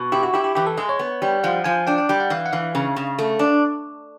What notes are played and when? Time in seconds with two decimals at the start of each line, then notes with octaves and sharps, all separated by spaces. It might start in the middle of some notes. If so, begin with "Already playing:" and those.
Already playing: B2
0.12 E4 G4
0.23 F#4
0.34 E4 G4
0.44 G4
0.55 E3 G4
0.67 A4
0.77 G#3 G#4
0.89 C#5
0.99 B3
1.22 G3
1.44 F3 F#5
1.64 F3 G#5
1.87 D4 G5
1.98 G5
2.09 G3 G5
2.20 F#5
2.30 E3 F5
2.46 F#5
2.53 E3 F5
2.75 C#3
2.96 C#3
3.19 A3
3.39 D4